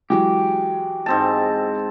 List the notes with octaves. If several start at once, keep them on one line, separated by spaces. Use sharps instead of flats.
E3 F#3 G#3 G4
G#2 C4 A5